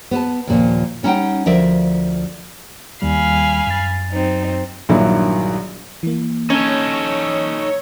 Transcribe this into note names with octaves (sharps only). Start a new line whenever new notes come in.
B3 B4 A5
D#2 A#2 F3
G3 C#4 D#4 E5 F#5 G5
D2 F3 A#4 D5 E5
D#2 D#3 G3 F5 G#5 B5
F#2 A6
F#3 C4 D#4
A#1 G2 D#3 F#3 E4
E3 A#3
C#4 D#4 A4 C#5